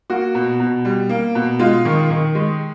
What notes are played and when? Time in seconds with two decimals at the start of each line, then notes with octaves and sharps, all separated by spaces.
0.10 A#3 F#4
0.35 B2
0.60 B2
0.85 G3
1.09 A#3
1.35 B2
1.59 G#3 F4
1.85 D#3
2.10 D#3
2.35 G#3